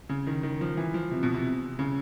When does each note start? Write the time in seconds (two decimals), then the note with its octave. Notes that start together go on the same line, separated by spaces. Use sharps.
0.09 C#3
0.27 D#3
0.43 D#3
0.61 F3
0.77 E3
0.94 F3
1.11 C3
1.23 B2
1.34 C3
1.79 C#3